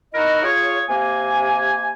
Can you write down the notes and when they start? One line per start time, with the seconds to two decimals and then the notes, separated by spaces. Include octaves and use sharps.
0.13 D#4 E4 F#4 A#4 D#5
0.42 F4 G#4 C#5
0.88 C3 A#3 G#5